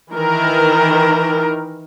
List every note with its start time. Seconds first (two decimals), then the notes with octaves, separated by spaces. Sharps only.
0.13 D#3 E3 A#4